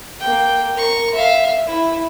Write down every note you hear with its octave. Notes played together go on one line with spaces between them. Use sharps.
A#3 G5
A#4 C#6
E5 F5
E4